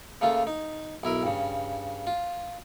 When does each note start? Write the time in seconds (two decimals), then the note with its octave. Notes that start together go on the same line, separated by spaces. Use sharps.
0.21 C#3 A3 A#3 F4
0.47 D#4
1.03 B1 E4 A#4 D#6
1.23 G2 C#3
2.07 F4